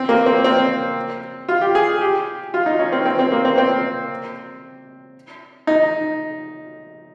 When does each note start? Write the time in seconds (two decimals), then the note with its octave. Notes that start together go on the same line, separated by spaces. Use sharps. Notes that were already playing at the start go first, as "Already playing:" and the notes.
Already playing: C4
0.09 A#3
0.26 C4
0.44 C4
1.49 F4
1.61 G4
1.75 G#4
2.01 G4
2.54 F4
2.66 D#4
2.79 C#4
2.92 C4
3.06 C4
3.19 C4
3.32 A#3
3.45 C4
3.58 C4
5.67 D#4